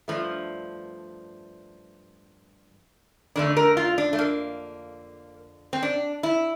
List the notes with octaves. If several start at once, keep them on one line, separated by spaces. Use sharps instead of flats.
G2 F3 A3
F2 D3 A3 D4
A#4
F4
D4
A3
A#3
C4
D4
E4